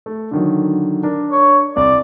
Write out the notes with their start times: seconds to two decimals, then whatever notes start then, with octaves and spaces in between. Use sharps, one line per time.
0.06 A3
0.31 D3 D#3 F#3
1.03 D4 A#4
1.32 C#5
1.76 C2 D5